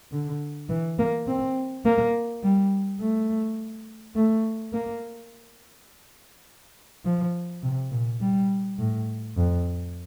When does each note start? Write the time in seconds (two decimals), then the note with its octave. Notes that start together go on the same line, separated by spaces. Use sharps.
0.12 D3
0.69 E3
0.99 A#3
1.27 C4
1.85 A#3
2.43 G3
3.01 A3
4.16 A3
4.73 A#3
7.05 F3
7.63 C3
7.91 A#2
8.21 G3
8.78 A2
9.37 F2